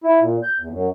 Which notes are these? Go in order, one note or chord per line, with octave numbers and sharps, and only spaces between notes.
E4
A#2
G6
E2
F#2